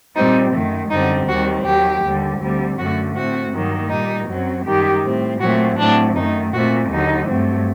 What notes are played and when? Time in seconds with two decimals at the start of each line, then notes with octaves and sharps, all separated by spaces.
0.16 A#2 G3 C4 D#4
0.53 F#2 D#3 A3
0.90 F#2 D3 G3 C4 D#4
1.28 D#2 D#3 G3 C4 F#4
1.65 D#2 D#3 F#3 G4
2.03 D#2 D3 G3
2.41 D2 D3 G3 C4
2.78 F#2 D3 F#3 A3 F#4
3.16 A2 A3 C4 F#4
3.52 G2 D#3 F#3 A#3
3.90 A#2 G3 A#3 D#4
4.28 F#2 F#3 C4
4.65 F#2 D#3 G3 G4
5.03 A2 G3 C4
5.40 A#2 F#3 A3 C4 F#4
5.78 A2 F#3 C4 D4
6.15 F#2 D#3 A3 D#4
6.53 A#2 A3 C4 F#4
6.90 D#2 D3 F#3 D#4
7.28 G2 F#3 A3 C4